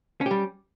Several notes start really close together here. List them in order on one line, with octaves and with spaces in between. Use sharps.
C#4 G4 G3